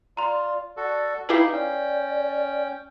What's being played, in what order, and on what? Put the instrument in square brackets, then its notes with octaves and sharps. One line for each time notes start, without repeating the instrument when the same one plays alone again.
[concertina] F4 [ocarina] D5 [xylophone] A#5 C6
[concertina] F#4 A4 [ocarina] D5
[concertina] D#4 [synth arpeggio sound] E4 G4 G#4 [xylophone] B4 D6 C7 [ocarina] F5
[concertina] C#4 G5 [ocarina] D5